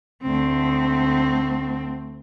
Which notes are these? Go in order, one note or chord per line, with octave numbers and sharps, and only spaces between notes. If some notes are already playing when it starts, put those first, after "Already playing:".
D2 C4